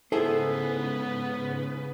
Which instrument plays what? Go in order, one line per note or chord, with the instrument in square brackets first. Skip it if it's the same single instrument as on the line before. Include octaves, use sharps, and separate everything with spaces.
[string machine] G#2 C#3 B4 [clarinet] B3 [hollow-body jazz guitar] E4 G#4 C5 [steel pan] A4